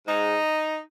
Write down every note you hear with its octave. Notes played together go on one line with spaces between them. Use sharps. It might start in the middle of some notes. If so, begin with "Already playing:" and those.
G#2 D#4